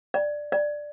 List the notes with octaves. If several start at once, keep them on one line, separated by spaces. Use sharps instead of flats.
D5
D5